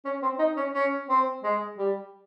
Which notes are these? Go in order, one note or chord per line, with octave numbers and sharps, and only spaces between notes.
C#4
C4
D#4
C#4
C#4
C4
G#3
G3